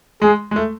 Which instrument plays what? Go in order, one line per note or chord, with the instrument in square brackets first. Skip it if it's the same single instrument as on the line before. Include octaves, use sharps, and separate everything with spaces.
[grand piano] G#3 [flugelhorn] G#4
[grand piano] G#3
A3